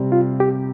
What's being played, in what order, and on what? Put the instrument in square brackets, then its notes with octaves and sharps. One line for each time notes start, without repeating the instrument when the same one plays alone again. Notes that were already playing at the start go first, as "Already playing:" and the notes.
Already playing: [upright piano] C3 G3 C4
[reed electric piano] F4
G4